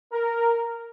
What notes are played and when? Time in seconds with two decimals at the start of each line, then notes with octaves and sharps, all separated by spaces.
0.12 A#4